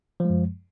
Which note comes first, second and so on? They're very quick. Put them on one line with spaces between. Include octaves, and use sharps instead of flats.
F3 G#3 F#2